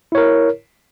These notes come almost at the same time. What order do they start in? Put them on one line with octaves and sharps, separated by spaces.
E4 C#5 A#4